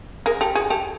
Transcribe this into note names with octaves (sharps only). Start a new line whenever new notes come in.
G#4 A#4
G4 A4
F#4 G#4
G4 A4